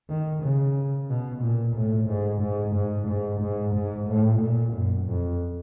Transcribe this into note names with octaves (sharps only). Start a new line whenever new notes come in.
D#3
C#3
B2
A#2
A2
G#2
G#2
G#2
G#2
G#2
G#2
A2
A#2
F#2
F2